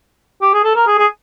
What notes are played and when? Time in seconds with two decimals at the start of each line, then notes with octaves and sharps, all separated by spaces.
0.41 G4
0.53 G#4
0.64 A4
0.76 A#4
0.87 G#4
0.98 G#4